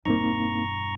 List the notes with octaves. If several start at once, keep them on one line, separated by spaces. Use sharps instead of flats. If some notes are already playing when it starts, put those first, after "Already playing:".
E1 G2 A#3 C4 D#4 A#5 C#6